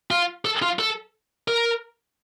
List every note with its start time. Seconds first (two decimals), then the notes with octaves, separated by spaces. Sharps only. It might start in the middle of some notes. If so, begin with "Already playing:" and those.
0.11 F4
0.45 A4
0.62 F4
0.79 A4
1.48 A#4